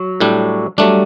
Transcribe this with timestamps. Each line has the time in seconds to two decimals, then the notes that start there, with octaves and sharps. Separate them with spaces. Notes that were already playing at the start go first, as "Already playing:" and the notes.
Already playing: F#3
0.20 A2 G3 D4
0.78 F#3 G3 A3 D4